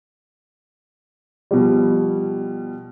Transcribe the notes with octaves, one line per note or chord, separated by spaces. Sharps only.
B2 F3 G3